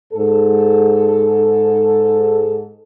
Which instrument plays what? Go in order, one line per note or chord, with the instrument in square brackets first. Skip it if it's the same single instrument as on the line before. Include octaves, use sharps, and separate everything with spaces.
[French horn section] G#2 A4